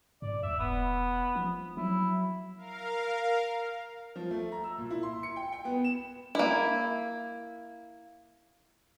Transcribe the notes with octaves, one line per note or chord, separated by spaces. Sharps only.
G#2 D5
D#2 E5
E1 B3
F3
F#3 E4
A#4 F5
F3
A3
A#5
E6
A#2
E4
C6
C#7
G5
G5
B3
E7
A#3 E4